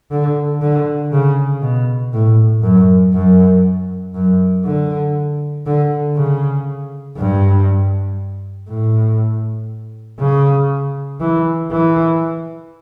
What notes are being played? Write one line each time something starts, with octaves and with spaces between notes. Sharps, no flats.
D3
D3
C#3
B2
A2
F#2
F#2
F#2
D3
D3
C#3
G2
A2
C#3
E3
E3